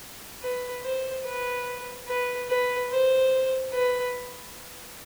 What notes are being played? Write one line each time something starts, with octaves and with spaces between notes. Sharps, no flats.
B4
C5
B4
B4
B4
C5
B4